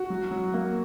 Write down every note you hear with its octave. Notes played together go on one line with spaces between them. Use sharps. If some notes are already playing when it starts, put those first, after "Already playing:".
Already playing: F#4
F#3
F#3
A#3